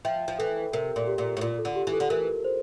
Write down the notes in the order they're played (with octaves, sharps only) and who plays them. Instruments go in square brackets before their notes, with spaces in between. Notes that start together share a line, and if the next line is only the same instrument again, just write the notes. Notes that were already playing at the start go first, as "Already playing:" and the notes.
[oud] F3 [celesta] E5 G5
[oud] F3
[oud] E3 [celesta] A4
[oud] C3 [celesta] A#4
[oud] A#2
[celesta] G4
[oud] A#2
A2
[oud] A#2 [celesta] F4
[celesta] A4
[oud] D3
[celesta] G4
[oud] E3
[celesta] A4
[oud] D3
[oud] E3 [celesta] A#4
[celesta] C5